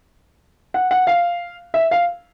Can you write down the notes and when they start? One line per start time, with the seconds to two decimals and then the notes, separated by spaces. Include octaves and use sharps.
0.74 F#5
0.91 F#5
1.07 F5
1.74 E5
1.91 F5